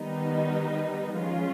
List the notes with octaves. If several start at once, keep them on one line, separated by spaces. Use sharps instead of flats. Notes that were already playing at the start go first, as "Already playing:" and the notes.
Already playing: D#3 G3 B3 D#4
F3 G#3 C#4 F4